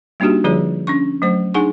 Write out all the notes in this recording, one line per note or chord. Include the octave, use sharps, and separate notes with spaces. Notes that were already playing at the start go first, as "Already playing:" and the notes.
G3 A#3 D4 D#4 F#4 G4
D3 F3 G3 F4 G#4 C#5
C#4 D4 C#6
F#3 A3 C5
D4 D#4 G#4 F#5 G#5 C#6